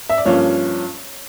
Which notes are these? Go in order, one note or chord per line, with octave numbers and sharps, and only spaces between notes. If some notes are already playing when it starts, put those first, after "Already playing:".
E5
D5
G2 F3 A#3 C#4 C#5